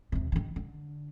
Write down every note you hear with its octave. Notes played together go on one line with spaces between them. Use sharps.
D#2 C3
D3 D#3
D3